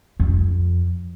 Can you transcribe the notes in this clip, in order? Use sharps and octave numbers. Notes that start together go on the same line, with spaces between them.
F2